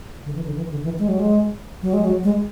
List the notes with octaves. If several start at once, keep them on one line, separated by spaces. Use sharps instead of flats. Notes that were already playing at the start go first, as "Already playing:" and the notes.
D3
E3
D3
E3
D3
E3
G#3
F#3
G#3
F#3
G#3
F#3
G#3